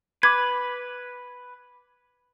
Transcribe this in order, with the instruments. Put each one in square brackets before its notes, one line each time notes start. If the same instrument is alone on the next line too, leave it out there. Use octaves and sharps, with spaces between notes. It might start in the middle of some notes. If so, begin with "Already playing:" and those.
[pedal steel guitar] B4 [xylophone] D6 G#6